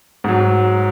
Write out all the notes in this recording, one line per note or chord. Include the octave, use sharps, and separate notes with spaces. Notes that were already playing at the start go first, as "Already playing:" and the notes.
G#2 F#3